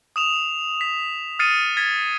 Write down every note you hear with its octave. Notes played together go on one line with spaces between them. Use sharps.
D#6 E7 F7
B6
D#6 F6 A6 C7 C#7 D#7
G#6 A6 B6